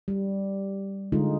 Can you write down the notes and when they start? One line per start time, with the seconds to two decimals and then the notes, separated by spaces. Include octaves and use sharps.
0.08 G3
1.12 D3 G#3 D#4 F4